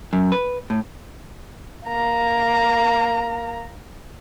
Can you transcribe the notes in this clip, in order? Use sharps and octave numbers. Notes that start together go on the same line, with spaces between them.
F#2
B4
A2
A#3 A#5